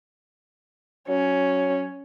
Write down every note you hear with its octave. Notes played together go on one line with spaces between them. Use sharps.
F#3 C#4